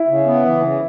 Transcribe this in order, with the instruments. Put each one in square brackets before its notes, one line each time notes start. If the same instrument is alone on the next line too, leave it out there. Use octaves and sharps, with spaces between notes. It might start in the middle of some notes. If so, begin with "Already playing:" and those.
Already playing: [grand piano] E4
[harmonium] C#3
B3
E3
C#3